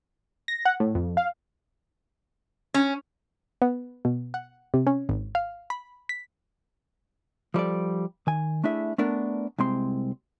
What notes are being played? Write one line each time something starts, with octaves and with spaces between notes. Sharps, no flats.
A#6
F#5
A2
F2
F5
C#4
B3
B2
F#5
C3
C#4
G#1
F5
B5
B6
F3 G3 A4 D5
D#3 G#5
A3 D4 E4 G#4 E5
A3 B3 D4 A#4
C2 G#3 C4 C6